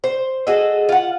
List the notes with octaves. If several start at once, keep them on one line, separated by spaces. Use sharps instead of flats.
C5
F#4 G#4 A4 D#5
F4 F#5